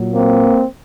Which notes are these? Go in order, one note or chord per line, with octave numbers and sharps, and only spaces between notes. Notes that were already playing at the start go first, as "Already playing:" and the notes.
Already playing: A#2 F#3
A#3 C4